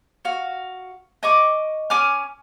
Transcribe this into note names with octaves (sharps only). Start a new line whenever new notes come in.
F#4 F5
D#5 C#6 D6
C#4 G#5 D6 F6